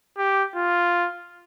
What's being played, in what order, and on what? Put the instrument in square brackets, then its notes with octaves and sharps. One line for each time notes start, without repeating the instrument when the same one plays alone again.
[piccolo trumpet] G4
F4